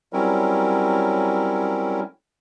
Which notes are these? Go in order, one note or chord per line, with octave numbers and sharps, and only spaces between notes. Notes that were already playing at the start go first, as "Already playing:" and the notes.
F#3 G3 C4 C#4 E4 A#4